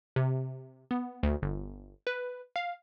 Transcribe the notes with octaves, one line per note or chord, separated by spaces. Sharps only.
C3
B3
D2
G1
B4
F5